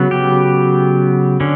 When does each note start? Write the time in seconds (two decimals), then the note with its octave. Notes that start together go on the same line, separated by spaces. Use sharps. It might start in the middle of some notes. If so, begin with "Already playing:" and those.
Already playing: C#3 F#3 B3
0.11 G4
1.40 D3 C#4